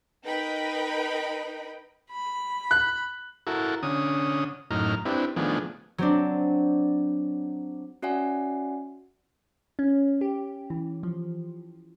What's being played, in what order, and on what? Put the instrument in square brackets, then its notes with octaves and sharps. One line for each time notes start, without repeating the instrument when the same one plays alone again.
[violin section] D#4 A#4 B4 D#5 G5 B5
[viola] B5
[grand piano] F#6
[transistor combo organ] E4 F#4 A4 A#4
D3 C#4 D#6
F#2 A2 D#4 A#5 F6
C4 D4 E4 G4 B4
D#3 F3 A3 B3 D4 G#4
[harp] F#3 C4 D4
[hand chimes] C#4 F#4 D5 E5 F#5 G#5
[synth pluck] C#4
G4
E3
F3